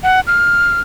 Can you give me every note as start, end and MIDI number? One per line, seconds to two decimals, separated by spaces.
0.03 0.20 78
0.27 0.80 89